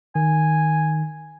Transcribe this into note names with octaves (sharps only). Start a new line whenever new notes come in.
D#3 G#5